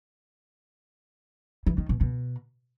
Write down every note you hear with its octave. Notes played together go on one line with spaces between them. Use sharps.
E3
D#3
B2
B2